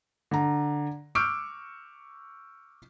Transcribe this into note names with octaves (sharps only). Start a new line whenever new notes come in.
D3 A#5
C#6 D6 E6 F6 G6 D7